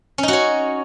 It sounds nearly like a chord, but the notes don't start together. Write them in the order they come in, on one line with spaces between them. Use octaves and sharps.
C#4 D#4 F#4 C#5